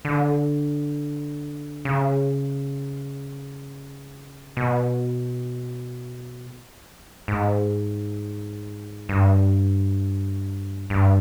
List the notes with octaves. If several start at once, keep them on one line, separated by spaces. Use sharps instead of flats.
D3
C#3
B2
G#2
G2
G2